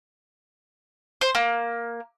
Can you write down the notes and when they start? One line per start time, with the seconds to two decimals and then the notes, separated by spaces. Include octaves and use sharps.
1.21 C5
1.35 A#3